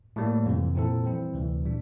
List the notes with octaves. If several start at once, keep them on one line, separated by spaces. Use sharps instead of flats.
A2 G3 A#3
F2 C3 E3
A#2 F3 C4 E4 A4
E3 G3 C4 E4
D2 C3 E3
A#2 G3 D4